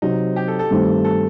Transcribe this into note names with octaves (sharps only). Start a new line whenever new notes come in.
C3 F#3 C4 D#4
G4
A4
A4
G2 D#3 A3 C4 G4
A4